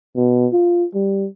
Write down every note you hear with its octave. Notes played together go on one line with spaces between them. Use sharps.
B2
F4
G3